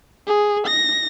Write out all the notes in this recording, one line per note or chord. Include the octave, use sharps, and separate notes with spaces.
G#4
A#6